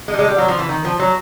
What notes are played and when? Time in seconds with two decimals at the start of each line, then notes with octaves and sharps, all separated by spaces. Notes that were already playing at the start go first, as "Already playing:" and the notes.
0.08 G#3
0.14 G3
0.19 G#3
0.28 G3
0.38 F#3
0.48 F3
0.59 E3
0.69 D#3
0.85 F3
0.99 F#3